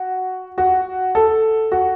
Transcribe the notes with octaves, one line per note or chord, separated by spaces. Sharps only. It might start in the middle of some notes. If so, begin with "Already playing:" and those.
Already playing: F#4
F#4
A4
F#4